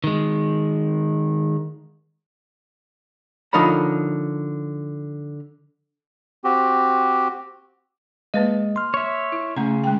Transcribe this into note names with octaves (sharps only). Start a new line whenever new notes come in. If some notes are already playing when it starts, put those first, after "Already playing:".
D#3 G#3
D3 F3 D#4 A#4 C#5 B5
C4 F#4 G4
G#3 A#3 B4 D#5 F5
C6 F6
C#5 E5
E4
C#3 A3 C#4 A#5
G#3 G5